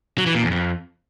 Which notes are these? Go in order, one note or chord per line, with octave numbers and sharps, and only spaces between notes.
F#3
E3
A#2
E2
F2